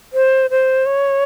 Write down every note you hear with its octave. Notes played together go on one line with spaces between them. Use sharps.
C5
C5
C#5